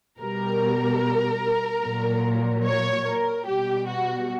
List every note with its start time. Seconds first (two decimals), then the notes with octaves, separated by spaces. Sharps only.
0.20 B2 G3 A#4
1.83 A#2 F#3
2.65 C#5
3.05 A#4
3.46 B2 G3 G4
3.87 F#4